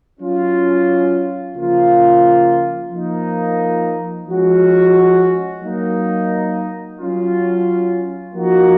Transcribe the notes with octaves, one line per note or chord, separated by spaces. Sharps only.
F#3 C#4 F4
C#3 F3 A#3 F4
F3 A#3 D#4
F3 G#3 C#4 F#4
F#3 A#3 D#4
F#3 C#4 F4
F3 A#3 D#4 F#4